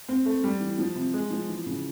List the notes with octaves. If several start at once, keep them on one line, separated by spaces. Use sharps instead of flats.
C4
A3
G3
E3
F3
C3
G#3
F3
E3
C#3